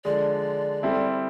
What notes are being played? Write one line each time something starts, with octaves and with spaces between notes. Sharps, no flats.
D3 F3 G#3 D5
G3 C4 E4 A4